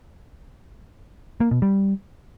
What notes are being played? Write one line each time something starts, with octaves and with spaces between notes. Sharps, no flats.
A#3
B2
G3